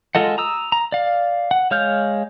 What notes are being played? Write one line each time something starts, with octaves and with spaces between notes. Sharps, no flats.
G#3 F4 A4 D#5 F#5
A#5 D#6 E6
A#5
D5 F5
F#5
G#3 C#5 F5 F6 G6